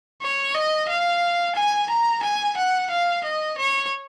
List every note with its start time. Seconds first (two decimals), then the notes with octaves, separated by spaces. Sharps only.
0.22 C#5
0.55 D#5
0.89 F5
1.55 G#5
1.90 A#5
2.23 G#5
2.57 F#5
2.90 F5
3.24 D#5
3.58 C#5